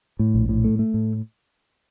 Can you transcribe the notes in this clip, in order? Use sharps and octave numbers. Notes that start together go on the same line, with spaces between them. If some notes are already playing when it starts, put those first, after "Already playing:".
A2
A#1
A2
A3
A3
A2